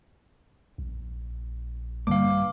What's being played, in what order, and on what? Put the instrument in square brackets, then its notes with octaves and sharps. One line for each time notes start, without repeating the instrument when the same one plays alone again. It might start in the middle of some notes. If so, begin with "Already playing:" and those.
[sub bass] A#1
[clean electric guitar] G2 [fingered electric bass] D3 A#3 [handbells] F5 D6